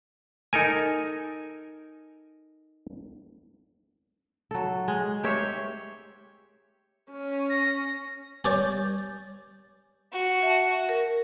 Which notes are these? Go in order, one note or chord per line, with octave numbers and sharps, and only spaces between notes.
D#4 A4 A#4 G#5
F#3 A4
G#3
G4 C5 C#5 E5
C#4
A#6
G3 C#5 D5 G#5 G6 A6
F#4
E5 A5
A#4